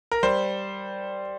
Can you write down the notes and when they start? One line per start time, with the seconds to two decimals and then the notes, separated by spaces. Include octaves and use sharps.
0.12 A#4
0.23 G3 C5